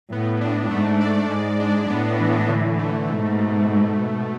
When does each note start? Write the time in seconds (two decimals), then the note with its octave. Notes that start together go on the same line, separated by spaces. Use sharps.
0.12 A2 B3
0.41 D4
0.71 G#2 A3
1.01 D5
1.30 G#2 G#3
1.60 D4
1.90 A2 B3
2.20 E3
2.49 D3
2.79 A3
3.09 G#2 B2
3.39 B2